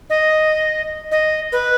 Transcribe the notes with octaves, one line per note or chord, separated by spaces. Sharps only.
D#5
D#5
B4